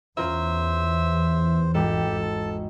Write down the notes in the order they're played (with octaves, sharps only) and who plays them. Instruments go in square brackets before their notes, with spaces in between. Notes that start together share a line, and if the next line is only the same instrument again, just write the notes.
[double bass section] E2 [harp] C#4 F4 A#4 [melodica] C5 [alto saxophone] E5
[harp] G#1 [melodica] G4 [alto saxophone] A4
[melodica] A5